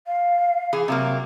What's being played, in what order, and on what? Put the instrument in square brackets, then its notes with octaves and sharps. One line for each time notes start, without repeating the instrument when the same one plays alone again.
[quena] F5
[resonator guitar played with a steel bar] E3 G#4
C3 F#3 A#3